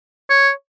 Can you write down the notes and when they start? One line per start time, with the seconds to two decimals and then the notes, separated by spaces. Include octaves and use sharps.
0.30 C#5